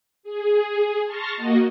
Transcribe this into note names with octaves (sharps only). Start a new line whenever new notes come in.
G#4
A5 C6 C#6 F6 A6 A#6
A#3 F#4 D#5